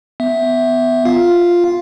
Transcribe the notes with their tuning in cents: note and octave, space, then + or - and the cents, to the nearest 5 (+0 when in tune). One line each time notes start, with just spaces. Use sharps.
B3 +20 E5 +0
F4 +0 F5 +0